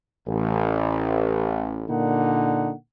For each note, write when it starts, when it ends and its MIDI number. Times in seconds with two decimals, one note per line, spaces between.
0.27 1.84 33
1.89 2.72 46
1.89 2.72 50
1.89 2.72 58
1.89 2.72 63
1.89 2.72 78